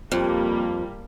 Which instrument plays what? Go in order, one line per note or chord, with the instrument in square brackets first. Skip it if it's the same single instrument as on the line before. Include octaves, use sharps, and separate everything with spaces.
[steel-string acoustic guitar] F2 [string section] G3 A#3